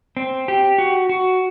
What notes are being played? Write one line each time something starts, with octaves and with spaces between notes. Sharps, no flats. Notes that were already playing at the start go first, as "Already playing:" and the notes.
C4
G4
F#4
F#4